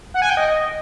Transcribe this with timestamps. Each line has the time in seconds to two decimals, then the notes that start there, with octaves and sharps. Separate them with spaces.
0.14 F#5
0.22 G#5
0.29 G5
0.37 D#5